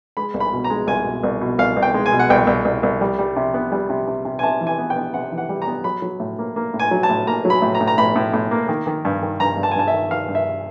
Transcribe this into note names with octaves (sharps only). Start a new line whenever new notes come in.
G#3 B5
C2
B5
B2
A#5
G#3
C2 G#5
B2
C2
B2
C2 F5
C2
G5
G#3
G#5
B2
F#5
C2 G5
C2
C2
C2
G3
G3
C3
B3
G3
C3
C3
C3
G#5
C3 A5
E3
G#5
B3
G5
B3
C3 F#5
E3
F#5
G3
A#5
B3
F#3 B5
F#3
A2
A#3
A#3
A2
G#5
F#3
A5
A2
A#3 A#5
F#3
B5
A2
A#5
A2
A#5
A2 B5
A2
A2
A#3
D#3
D#3
G2
D#3
G2 A#5
G2
A5
G#5
G2 A5
E5
D#3
D#3 F5
G2
E5